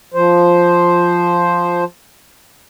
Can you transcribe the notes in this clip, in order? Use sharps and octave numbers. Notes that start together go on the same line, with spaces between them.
F3 C5